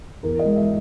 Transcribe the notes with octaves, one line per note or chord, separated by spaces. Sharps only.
E2 A#4
D#5
G#3
E5